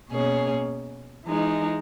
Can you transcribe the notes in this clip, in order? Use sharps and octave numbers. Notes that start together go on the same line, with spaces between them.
B2 A#3 C#4 G#4 C#5
E3 G#3 D#4